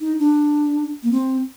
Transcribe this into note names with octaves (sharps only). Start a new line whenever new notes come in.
D#4
D4
A#3
C4